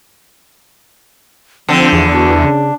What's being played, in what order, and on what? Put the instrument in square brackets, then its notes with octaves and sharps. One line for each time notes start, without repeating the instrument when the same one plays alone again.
[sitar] D3 [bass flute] F3 [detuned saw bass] C4
[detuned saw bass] E2
[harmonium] D4 [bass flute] F#4
[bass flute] C#3